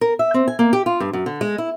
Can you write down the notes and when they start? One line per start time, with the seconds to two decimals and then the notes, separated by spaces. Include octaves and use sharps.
0.01 A#4
0.19 E5
0.34 C4
0.48 G#5
0.59 A#3
0.73 G4
0.86 F4
1.00 G2
1.13 F#2
1.26 D3
1.41 G#3
1.58 E4